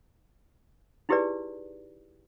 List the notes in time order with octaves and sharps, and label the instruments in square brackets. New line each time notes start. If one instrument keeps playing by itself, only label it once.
[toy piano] D#4 E4 G4 G#4 B4 D5